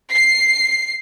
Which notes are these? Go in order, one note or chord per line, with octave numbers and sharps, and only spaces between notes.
C7